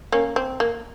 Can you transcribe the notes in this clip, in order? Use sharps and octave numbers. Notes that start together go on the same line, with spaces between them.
A#3 C#4
C4
A#3